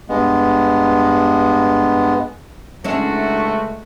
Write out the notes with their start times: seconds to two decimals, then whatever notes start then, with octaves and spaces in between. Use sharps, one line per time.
0.09 G2 G#3 B3
2.84 C#2 F#3 G#3 A3 C#4 D4 E4 F#4